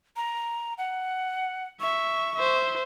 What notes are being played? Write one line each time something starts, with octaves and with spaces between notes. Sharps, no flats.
A#5
F#5
E5 C#6
C5 E5